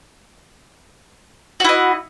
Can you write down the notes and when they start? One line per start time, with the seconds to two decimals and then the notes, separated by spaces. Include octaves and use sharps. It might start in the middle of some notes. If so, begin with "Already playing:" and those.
1.60 F#4
1.64 E4
1.69 D#5